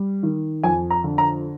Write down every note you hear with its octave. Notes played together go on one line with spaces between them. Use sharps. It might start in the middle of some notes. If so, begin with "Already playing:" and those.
Already playing: G3
D#3
F2 G#5
A#5
D3
A#5